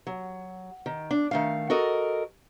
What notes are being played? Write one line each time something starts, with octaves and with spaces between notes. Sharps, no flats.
F#3
D#3
D4
D#3 A3 F5
F#4 A4 A#4 D#5